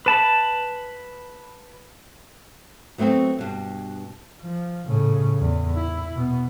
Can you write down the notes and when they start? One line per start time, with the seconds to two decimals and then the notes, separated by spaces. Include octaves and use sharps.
0.06 B4 A5 B5
2.98 F#3 A3 B3 C4 F#4
3.39 G2 B2
4.41 F3
4.88 A2 C#3
5.39 E2
5.76 E4
6.15 B2 B3